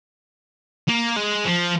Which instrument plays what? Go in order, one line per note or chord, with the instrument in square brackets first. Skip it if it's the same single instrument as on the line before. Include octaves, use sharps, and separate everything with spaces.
[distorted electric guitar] A#3
G#3
F3